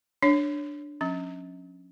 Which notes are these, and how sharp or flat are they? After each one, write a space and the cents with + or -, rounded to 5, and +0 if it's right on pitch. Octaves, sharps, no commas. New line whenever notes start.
D4 +0 C#5 +0
F3 +40 C#4 -20